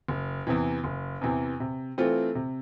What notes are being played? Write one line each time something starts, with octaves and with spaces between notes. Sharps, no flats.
F#1
E2 C3 E3
F#1
E2 C3 E3
C3
E3 A3 C4 F4
C3